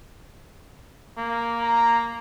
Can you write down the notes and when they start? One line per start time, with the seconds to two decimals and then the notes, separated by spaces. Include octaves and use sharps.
1.18 A#3
1.62 A#5